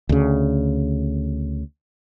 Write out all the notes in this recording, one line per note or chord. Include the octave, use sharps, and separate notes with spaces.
D2 C#3